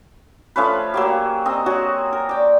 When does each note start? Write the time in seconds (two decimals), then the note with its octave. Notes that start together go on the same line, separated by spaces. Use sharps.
0.56 F3 A3 C#4 B4
0.94 F#3 A#3 G4
1.46 C4 D#5
1.66 F#3 F#4 G#4
2.13 A#4
2.29 D5 G5